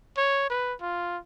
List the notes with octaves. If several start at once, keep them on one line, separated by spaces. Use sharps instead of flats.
C#5
B4
F4